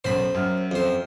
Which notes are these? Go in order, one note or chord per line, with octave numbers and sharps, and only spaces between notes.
B1 F#2 C5 B5
F#2 E5 F6
F2 C5